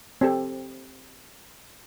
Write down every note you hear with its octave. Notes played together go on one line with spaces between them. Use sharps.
C4 G4 A4